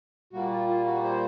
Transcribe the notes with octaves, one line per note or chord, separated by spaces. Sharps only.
A#2 G3 A#3 F#4
F4
F4
F#4
C5